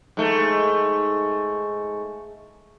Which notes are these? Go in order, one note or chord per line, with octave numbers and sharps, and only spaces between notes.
G#2 A3